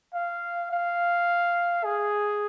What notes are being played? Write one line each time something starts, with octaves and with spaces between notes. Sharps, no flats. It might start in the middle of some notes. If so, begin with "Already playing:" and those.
F5
F5
G#4